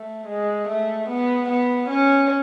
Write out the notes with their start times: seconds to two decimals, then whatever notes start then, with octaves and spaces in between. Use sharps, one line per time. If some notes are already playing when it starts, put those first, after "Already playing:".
Already playing: A3
0.27 G#3
0.68 A3
1.09 B3
1.49 B3
1.89 C#4